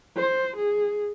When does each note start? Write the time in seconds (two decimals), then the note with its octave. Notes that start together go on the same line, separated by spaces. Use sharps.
0.16 C5
0.56 G#4